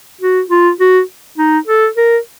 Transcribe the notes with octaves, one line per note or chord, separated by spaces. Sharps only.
F#4
F4
F#4
D#4
A4
A#4